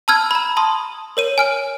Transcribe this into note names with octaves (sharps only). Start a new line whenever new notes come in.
A5 B5 E6 F6 G#6
A#5 B5
A5 C6 D#6
A#4 C#5 D#7
G#5 F6 D7